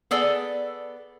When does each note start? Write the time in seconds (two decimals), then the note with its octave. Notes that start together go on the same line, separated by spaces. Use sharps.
0.11 B3 G#4 A4 D5